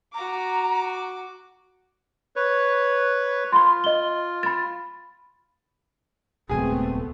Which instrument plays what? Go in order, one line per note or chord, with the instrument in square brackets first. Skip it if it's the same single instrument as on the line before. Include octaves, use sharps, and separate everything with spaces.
[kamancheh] F#4 D6 [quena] A#5
[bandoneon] B4 C#5
[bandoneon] F4 [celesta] B5 C6
[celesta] D#5 G7
B5 A6
[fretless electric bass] D#1 C#2 F#3 [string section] A3 B3 [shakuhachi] C4 [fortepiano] G#4 G#5